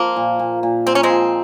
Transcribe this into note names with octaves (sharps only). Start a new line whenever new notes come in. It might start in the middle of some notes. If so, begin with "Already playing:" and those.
Already playing: F3 A#3
A#2
A#2
A#2
A#3 C4
C#4
G#3 C4
F3